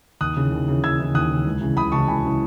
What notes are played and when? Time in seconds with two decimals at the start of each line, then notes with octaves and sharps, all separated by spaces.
0.21 D#2 D#6 F#6
0.37 C#3 E3
0.52 D#2
0.68 C#3 E3
0.84 D#2 E6 G#6
0.99 C#3 E3
1.14 D#2 D#6 F#6
1.30 C#3 E3
1.46 C#2
1.61 C#3 E3
1.76 C#2 B5 D#6
1.92 C#3 E3 A5 C#6
2.08 C#2 G#5 B5
2.23 C#3 E3